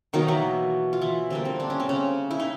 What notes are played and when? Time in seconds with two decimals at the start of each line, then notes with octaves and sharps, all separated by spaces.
0.13 B2 D#3 F#3 A#3 D#4
0.28 E3 E4
0.93 F4
1.01 E3 E4
1.30 D3 G3 A#3 C4
1.45 C4
1.60 D4
1.70 C#4
1.80 C4
1.89 C#3 C#4
2.31 E4
2.40 D#4